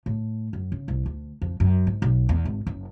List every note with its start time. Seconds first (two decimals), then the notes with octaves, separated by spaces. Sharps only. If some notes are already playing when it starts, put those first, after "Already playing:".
0.06 A2
0.53 F#2
0.72 C#3
0.88 C2
1.06 D2
1.41 F2
1.60 F#2
1.87 G#2
2.02 B1
2.29 E2
2.45 G#1
2.67 F#1